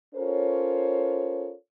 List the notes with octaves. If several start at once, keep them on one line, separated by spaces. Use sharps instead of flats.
C#4 F4 A4 A#4 C5 C#5